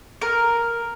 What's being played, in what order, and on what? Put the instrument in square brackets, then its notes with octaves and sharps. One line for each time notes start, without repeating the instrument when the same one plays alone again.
[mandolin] A#4